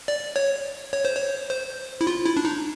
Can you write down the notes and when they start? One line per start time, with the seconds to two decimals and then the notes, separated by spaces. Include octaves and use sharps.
0.08 D5
0.36 C#5
0.93 C#5
1.05 C5
1.16 C#5
1.50 C5
2.01 E4
2.07 F4
2.25 E4
2.37 D4
2.45 D#4